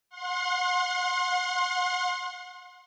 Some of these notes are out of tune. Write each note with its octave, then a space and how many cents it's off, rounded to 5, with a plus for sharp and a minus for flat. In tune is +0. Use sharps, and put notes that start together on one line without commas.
F#5 -35 C6 +25